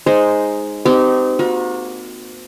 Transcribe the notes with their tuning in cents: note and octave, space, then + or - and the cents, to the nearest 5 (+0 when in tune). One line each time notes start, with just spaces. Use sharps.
G#3 +0 D#4 +0 C5 +0
C4 -35 D#4 -15 G4 -25
A#3 -10 F#4 -40 A#5 +35